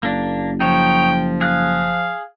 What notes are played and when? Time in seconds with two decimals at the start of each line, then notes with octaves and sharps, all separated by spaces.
0.03 F#1 A#3 D4
0.60 F3 D#4 F#4 C#5 G5
1.41 G#4 F5 F#6